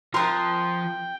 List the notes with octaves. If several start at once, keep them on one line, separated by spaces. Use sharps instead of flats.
C3 F3 A#4 G5 C6 D#6 F#6